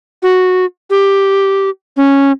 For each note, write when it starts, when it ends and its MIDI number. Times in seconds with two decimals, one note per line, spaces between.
0.23 0.65 66
0.90 1.70 67
1.97 2.32 61